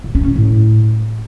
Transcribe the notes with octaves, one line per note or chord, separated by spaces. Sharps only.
A#2
C#4
A#2
A2